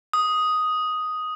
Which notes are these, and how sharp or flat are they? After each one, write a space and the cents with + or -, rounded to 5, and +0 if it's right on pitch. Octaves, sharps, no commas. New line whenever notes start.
D#6 +5